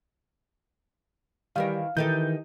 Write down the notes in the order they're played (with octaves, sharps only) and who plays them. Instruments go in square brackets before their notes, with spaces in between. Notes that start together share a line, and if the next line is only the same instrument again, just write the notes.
[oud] D#3 E3 A#4 [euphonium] G3 [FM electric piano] F5
[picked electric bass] D#3 [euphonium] E3 [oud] D#4 G4 A4 [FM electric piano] G6